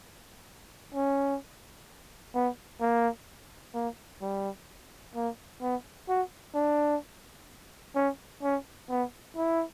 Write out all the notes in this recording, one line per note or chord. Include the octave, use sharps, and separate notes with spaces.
C#4
B3
A#3
A#3
G3
A#3
B3
F#4
D4
C#4
C#4
B3
E4